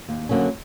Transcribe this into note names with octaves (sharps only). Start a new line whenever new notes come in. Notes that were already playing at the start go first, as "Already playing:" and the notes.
D#2
D3 F#3 A#3 C#4